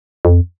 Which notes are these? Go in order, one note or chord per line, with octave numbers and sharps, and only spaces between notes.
F2